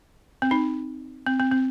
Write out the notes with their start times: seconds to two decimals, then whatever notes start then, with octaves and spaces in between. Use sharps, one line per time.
0.42 C4
0.51 D#4
1.26 C4
1.40 C4
1.52 C4